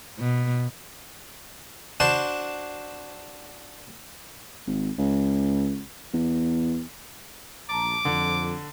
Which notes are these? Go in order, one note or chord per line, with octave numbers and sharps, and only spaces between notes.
B2
D4 F#4 C5 A5
G#1
C#2
E2
A#1 A5 A#5 D6
F2 D3